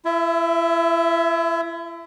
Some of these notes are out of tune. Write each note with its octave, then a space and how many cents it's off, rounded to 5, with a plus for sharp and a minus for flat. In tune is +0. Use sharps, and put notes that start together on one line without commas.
E4 +40 E5 +0